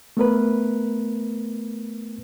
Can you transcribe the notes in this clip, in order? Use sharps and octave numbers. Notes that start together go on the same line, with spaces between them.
A3 B3 A#4 B4